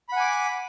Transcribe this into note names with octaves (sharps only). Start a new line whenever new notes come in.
F#5 G#5 B5 D6